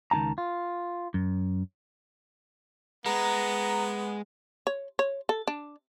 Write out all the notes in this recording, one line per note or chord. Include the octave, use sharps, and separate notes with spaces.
C#2 D#3 D#4 A5 A#5
F4
F#2
G#3 B3 A#5
C#5
C#5
A4
D4